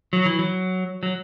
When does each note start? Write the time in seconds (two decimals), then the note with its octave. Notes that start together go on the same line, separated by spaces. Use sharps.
0.13 F#3
0.26 E3
0.39 F#3
1.03 F#3